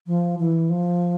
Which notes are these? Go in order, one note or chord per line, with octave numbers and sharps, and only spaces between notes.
F3
E3
F3